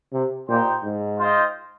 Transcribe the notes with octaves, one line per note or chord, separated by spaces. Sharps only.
C3
A#2 D#4 G4 C5 G5
G#2
F4 C5 D#5 G5